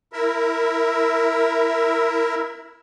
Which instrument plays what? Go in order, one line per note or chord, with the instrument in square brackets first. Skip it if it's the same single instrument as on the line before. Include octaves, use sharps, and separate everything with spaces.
[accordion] E4 A#4 E5